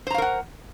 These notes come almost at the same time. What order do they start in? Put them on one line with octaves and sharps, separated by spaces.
C5 A#5 F5 A#4 F#5